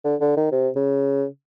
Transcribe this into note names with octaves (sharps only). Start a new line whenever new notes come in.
D3
D3
D#3
C3
C#3